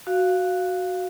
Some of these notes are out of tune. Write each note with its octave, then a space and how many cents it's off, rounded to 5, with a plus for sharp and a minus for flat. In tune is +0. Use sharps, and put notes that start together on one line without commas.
F#4 +0 F5 +0